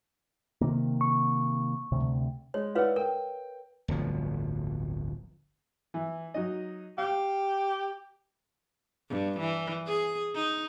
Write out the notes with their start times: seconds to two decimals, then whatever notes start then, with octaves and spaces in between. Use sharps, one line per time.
0.61 C3 D#3 A#3
1.01 C#6
1.92 D2 C3
2.54 G#3 C#5
2.75 E4 B4 C#5 D5 F5 F#5
2.96 A#4 G5
3.88 D1 G1 B2 F3
5.94 E3
6.34 F#3 D#4 D#5
6.98 G4 F5
9.09 G2
9.40 E3
9.86 G#4
10.34 D#4